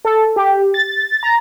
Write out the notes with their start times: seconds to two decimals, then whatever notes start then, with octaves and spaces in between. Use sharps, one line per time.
0.05 A4
0.36 G4
0.74 A6
1.23 A#5